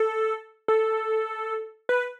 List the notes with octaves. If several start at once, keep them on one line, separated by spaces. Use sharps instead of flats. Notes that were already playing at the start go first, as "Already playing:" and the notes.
Already playing: A4
A4
B4